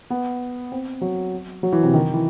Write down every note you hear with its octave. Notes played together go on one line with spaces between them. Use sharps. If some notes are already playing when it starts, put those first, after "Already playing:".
B3
C4
F#3
F#3
E3
C3
D#3
E3